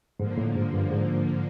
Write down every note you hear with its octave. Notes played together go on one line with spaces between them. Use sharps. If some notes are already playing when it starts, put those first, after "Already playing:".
G#2 D3 F3 A#3
A2
G#2
G2
G#2